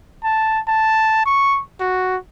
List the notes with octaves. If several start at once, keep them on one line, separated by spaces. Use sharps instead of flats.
A5
A5
C#6
F#4